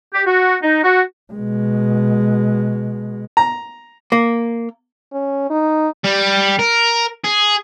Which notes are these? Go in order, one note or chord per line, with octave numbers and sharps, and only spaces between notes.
G4
F#4
D#4
F#4
B2 G#3
A#5
A#3
C#4
D#4
G3
A#4
G#4